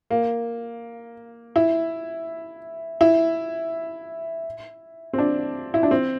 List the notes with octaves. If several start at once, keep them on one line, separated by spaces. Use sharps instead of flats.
A#3
E4
E4
C4
D4
E4
D4
C4